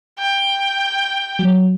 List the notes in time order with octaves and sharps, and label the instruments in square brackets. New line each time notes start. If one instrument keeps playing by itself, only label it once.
[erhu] G5
[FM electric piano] F#3